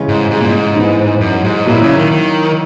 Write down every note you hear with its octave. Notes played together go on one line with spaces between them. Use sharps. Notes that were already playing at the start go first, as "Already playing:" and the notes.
Already playing: C#3 E3 G#3 C#4
G#2
G#2
A#2
G#2
E3 B3 D#4
F#2
G#2
A#2 F#3 A#3 E4
C#3
D#3
D#3